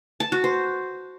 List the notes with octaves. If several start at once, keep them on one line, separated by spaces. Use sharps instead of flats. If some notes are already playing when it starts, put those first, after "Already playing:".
A5
F#4
C5